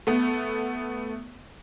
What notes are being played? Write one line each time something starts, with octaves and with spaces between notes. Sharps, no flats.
A3 B3